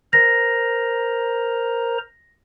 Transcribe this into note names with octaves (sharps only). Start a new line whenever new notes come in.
A#4 C5 A#5 A#6